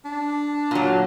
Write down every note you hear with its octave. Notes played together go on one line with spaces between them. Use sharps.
D4
A#2 F#3